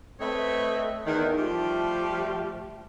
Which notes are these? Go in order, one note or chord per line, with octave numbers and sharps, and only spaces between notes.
A3 C4 B4 C#5 D#5 E5
E2 D#3
F3 G3 A3 F4 G4